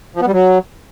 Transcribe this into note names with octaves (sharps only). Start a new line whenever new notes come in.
F3
B3
G3
F#3